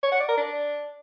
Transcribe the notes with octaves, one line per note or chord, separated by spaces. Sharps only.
C#5
F#5
D5
A#4
D4